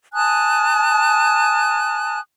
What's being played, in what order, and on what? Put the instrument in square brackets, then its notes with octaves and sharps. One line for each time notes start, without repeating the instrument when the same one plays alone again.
[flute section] G#5 A5 D#6 F#6